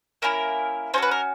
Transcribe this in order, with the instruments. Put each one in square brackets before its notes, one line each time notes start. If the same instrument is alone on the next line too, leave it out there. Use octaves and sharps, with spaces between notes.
[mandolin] A#3 C#4 E4 A#4
C#4 F#4 A4 C5
B4
A#4